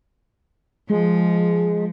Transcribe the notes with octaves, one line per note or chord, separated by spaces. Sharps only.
F3 G#3